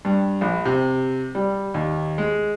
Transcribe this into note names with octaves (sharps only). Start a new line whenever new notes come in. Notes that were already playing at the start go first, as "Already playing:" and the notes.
G2
A#1
C3
G3
D#2
G#3